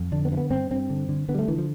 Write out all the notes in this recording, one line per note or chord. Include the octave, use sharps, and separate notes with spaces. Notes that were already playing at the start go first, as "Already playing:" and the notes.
Already playing: F2
D3 D4
B3
G2
B3
G2 C4
G2 C4
D3
D3
D3 B3
G3
A3
D3 E3
F3